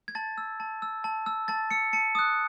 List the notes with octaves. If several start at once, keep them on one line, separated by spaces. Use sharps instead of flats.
G#6
A5 A6
E6
A5
E6
A5
E6
A5 A6
E6 C#7
A5 C#7
D#6 F#6